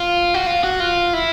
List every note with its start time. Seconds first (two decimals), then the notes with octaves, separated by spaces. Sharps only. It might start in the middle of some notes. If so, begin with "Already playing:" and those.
Already playing: F4
0.34 F#4
0.46 F4
0.64 F#4
0.80 F4
1.13 E4